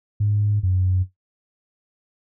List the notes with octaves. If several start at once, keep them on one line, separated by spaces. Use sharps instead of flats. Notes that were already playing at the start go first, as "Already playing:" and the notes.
G#2
F#2